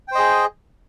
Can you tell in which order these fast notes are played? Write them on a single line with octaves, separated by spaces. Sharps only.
G5 C5 D#5 G#4